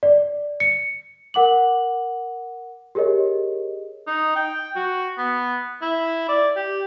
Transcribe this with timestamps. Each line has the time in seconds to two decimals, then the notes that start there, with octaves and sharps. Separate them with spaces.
0.03 D5
0.60 C#7
1.34 A#4 F#5 D6 F#7
2.95 G4 G#4 A#4 C#5 D#5
4.07 D#4
4.36 G5
4.76 F#4
5.18 B3
5.82 E4
6.29 D5
6.56 G4